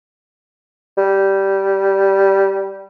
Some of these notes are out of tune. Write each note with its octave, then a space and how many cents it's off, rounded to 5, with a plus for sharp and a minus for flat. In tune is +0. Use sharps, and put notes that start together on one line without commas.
G3 -10